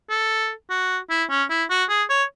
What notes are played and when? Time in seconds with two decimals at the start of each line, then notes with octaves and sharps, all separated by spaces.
0.10 A4
0.70 F#4
1.10 E4
1.30 C#4
1.50 E4
1.70 F#4
1.89 G#4
2.10 C#5